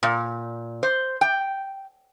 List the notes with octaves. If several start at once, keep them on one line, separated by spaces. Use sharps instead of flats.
A#2
C5
G5